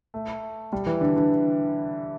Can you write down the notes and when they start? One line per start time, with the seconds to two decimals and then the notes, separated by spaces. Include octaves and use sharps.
0.14 A3
0.73 G3
0.86 E3
1.01 D3
1.16 D3